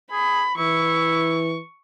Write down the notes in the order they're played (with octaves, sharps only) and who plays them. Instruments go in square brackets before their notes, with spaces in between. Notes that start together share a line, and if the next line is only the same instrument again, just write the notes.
[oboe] G#4 [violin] B5
[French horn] E3 [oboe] E4 [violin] C#6